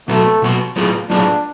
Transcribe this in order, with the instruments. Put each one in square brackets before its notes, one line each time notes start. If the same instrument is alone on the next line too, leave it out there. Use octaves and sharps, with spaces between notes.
[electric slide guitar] B2 F#3 B3 F#4 [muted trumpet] A3
[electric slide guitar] B2 F#3 B3 F#4
A2 F#3 B3 F4 G#4
[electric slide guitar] A2 F#3 B3 F4 G#4 [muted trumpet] D4